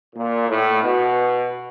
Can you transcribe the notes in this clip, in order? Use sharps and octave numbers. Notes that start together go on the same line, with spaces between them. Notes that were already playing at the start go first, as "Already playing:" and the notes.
A#2
A2
B2